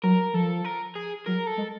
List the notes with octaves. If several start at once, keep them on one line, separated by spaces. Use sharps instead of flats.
F#3 A#4
F3 A4
A#4
G#4
F#3 A#4
A4
G#3